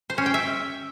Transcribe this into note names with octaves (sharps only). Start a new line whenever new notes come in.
C5
C#4
G5
E5